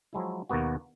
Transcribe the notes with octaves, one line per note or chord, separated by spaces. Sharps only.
F3 F#3 G#3 E4
D#2 B2 A#3 B3 F#4